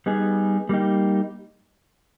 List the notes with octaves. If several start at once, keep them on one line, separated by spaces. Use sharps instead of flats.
G3 B3 D#4 G#4
G3 A#3 D#4 G4